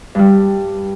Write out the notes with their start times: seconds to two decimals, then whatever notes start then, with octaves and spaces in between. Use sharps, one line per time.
0.15 G2 G3